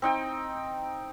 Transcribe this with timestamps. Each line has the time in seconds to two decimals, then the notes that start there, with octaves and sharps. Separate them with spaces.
0.02 C4 D#4 G5